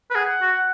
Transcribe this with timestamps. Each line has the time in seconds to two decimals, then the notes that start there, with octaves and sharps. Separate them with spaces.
0.10 B4
0.15 G#4 F#5
0.42 F#4